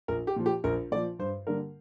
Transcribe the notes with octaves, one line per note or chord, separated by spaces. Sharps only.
A#1 A#4
G4
A#2 F3
G4
A#1 A#4
A#2 F3 D5
G2 C5
D3 G3 A#3 D4 A#4